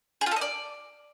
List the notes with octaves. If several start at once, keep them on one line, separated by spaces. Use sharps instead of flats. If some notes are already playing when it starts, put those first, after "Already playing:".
G#4
F4
A4
D#5
D5